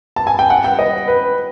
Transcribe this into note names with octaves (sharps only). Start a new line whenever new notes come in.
A5
G#5
G5
F#5
G5
D#5
B4